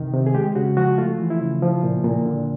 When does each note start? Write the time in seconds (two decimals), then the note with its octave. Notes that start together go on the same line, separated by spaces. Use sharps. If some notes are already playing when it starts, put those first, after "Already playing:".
Already playing: C3 D#3
0.14 C3
0.26 G#4
0.34 G#3 G4
0.56 C#3 F#4
0.77 F3 F#4
0.98 A3 F4
1.20 E3
1.30 E4
1.41 C#3
1.62 F3
1.83 A#2
2.04 A#2
2.25 D3